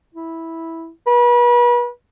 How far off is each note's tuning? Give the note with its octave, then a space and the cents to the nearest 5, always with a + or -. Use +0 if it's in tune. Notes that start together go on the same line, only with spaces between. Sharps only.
E4 -10
B4 -35